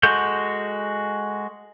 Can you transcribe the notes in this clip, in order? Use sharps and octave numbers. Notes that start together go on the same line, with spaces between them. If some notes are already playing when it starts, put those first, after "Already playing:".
G#3 F#4 A4 G6